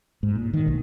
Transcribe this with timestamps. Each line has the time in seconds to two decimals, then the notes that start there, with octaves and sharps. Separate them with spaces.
0.23 G#2
0.35 A#2
0.54 D#3
0.68 B1